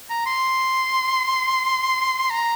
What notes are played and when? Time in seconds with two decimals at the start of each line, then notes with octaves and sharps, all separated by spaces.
0.10 A#5
0.26 C6
2.30 A#5